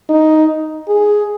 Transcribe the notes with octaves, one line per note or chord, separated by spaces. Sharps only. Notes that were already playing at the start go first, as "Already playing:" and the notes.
D#4
G#4